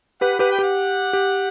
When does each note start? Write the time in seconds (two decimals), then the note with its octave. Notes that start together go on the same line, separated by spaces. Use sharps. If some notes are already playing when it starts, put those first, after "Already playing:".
0.21 G4 B4 F#5
0.39 G4 B4 F#5
0.51 G5
0.59 G4 F#5
1.13 G4